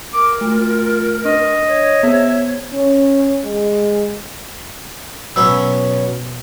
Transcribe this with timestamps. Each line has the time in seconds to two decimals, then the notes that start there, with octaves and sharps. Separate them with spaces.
0.14 A#4 D6
0.41 A3 F4
1.25 D4 D#5
1.67 C#5
2.03 B3 C5 E5
2.73 C#4
3.44 G#3
5.36 B2 F#3 B3 C#4 E6